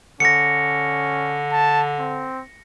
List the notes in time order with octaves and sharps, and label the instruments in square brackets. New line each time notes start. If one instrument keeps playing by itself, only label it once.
[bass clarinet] D3 [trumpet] C#4 [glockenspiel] A#6 C#7
[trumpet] A5
C4